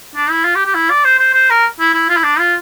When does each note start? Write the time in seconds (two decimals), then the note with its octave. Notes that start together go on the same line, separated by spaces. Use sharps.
0.16 D4
0.31 E4
0.45 F4
0.56 G4
0.66 G4
0.75 E4
0.90 D5
1.05 C5
1.19 C5
1.34 C5
1.50 A#4
1.80 E4
1.94 E4
2.09 F4
2.17 E4
2.24 D4
2.39 F4